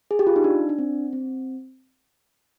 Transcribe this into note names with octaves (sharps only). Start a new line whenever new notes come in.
G#4
G4
F4
D#4
D4
D4
C4
C4